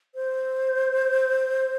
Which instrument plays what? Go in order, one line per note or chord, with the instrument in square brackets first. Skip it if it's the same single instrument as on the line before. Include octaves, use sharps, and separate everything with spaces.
[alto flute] C5